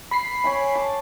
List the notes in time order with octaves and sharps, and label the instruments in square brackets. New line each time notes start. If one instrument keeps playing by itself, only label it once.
[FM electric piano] B5 B6 C7
[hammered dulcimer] C#5 G5 G#5
A5 D6